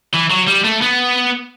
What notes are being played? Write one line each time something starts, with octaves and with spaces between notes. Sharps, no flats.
E3
F#3
G3
A3
B3